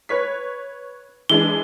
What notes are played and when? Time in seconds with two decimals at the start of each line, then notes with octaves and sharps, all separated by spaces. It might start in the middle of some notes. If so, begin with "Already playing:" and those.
0.09 B4 C#5 B6
1.29 E3 G#3 D4 G7